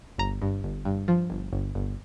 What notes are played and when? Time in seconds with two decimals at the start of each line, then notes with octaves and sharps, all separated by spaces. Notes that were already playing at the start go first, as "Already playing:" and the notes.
0.18 G1 A#5
0.42 G2
0.64 G1
0.85 G2
1.08 F3
1.30 G1
1.53 G1
1.75 G1